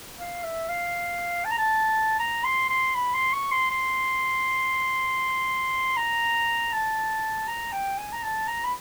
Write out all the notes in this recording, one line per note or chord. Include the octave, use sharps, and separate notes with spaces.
F5
E5
F5
A5
A#5
A5
A#5
C6
C6
B5
C6
C#6
C6
C6
A#5
A5
A#5
G5
G#5
A#5
A5
A#5
B5